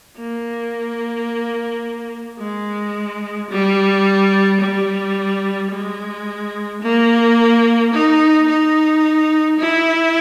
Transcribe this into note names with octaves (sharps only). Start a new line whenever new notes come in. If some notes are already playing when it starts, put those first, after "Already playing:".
A#3
G#3
G3
G3
G#3
A#3
D#4
D#4
E4